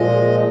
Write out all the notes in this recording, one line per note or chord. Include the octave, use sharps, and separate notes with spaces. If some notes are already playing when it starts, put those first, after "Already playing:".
Already playing: A#2 F3 G#3 D#5